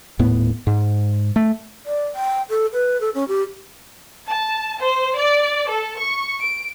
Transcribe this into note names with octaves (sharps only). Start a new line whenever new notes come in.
D#1 A2 B3
G#2
A3
D5
G5
A4
B4
A4
C#4
G4
A5
C5
D5
A4
C#6
D7